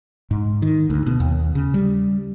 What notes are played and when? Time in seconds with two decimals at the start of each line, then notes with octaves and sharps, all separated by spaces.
0.31 G#2
0.62 D#3
0.90 D2
1.06 B2
1.20 D#2
1.55 C#3
1.74 G3